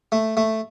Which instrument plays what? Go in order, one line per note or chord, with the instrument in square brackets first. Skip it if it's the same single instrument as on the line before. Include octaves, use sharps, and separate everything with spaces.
[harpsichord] A3
A3